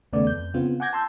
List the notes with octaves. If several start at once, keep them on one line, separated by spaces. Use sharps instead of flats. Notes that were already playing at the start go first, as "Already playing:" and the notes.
D#2 C#3 A3 B3 D5
F2 G6
C#3 B3 C4 F4
F#5 G#5 D6 G6 G#6 A#6
A5 C6 E6 G6